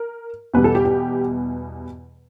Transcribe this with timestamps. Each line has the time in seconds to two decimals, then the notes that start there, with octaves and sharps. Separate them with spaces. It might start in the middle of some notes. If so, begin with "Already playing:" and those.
Already playing: A#4
0.54 E2 B2 G3 B3 B4
0.64 A4
0.75 G4
0.85 G4